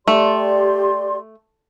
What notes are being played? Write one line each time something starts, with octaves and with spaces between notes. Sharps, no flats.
A3 G4 D5 C6